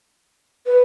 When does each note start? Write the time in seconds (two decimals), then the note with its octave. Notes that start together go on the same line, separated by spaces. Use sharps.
0.66 B4